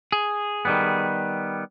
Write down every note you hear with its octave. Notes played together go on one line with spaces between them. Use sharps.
G#4
D#3 G3 B3